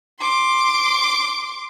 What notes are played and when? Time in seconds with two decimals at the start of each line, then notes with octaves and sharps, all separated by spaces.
0.20 C6 D6